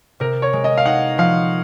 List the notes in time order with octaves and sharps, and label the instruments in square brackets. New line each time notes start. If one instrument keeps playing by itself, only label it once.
[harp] C3 [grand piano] A#4
[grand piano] C#5
[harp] G#3
[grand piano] D#5
F5
[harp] D#4 [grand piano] F#5
[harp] F3 [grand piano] F5